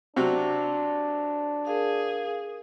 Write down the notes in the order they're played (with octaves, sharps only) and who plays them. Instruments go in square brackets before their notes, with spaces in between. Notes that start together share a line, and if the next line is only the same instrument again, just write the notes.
[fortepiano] C3 F#3 [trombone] D4
[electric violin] G#4 [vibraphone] A#4 F5